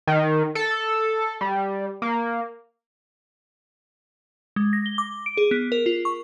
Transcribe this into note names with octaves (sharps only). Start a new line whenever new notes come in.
D#3
A4
G3
A#3
G#3
A#6
G7
D6
D7
G#4
B3
A#4
F4
C#6